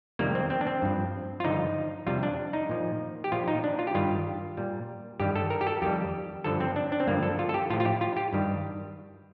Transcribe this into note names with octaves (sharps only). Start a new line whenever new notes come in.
F2 C3 D#3 G3 A#3
C4
C4
D4
C4
G2 F3
F4
G2 D3 F3 D#4
F2 C3 G3 F4
D4
D#4
A#2 F3
G4
A#2 F3 F4
D#4
D4
F4
G4
G2 D#3 G3 F4
A#2 G3
G2 D#3 G3 G4
A4
A#4
G4
A4
F2 D#3 G3 G4
G2 D3 F3 A4
C4
D4
D4
C4
G2 D3 F3 A#3
A4
F4
A4
G4
A2 F3 F4
F4
G4
F4
G4
G2 D#3 G3